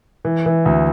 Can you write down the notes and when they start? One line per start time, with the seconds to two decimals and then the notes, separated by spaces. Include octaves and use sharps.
0.25 E3
0.46 E3
0.65 D2